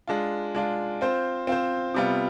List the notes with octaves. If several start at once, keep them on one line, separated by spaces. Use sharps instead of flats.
G#3 D4 F4
G#3 D4 F4
C4 F4 C5
C4 F4 C5
C3 G3 B3 F4